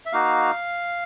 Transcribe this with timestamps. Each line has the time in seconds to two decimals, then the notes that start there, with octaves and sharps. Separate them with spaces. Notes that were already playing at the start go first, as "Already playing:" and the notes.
0.06 E5
0.12 A#3 D#4 F#4 F5